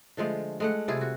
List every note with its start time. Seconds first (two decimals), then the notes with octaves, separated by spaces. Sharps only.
0.17 D3 F3 G#3 A3
0.60 G#3 A3 F#5
0.88 C3 G3 F4 G#4
1.01 F#4